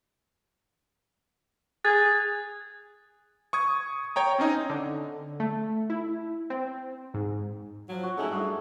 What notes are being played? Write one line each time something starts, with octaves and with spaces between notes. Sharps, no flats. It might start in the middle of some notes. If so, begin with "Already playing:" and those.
G#4 D#6 F#6 A6
C#6 D#6 G#6
C#5 G5 A#5
C4 C#4 D#4 D#5
D3
A3
E4
C4
G#2
F3 F#3
F#4
A3 C#4 D#4 E4 G#4 A4
G2